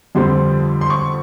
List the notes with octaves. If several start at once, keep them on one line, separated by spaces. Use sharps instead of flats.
F2 D3 G3 C4 C6
C6
C#6